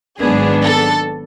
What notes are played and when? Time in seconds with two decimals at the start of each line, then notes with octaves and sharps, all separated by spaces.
0.19 G#1 G#2 F#3 B3 D4 G#4
0.62 A4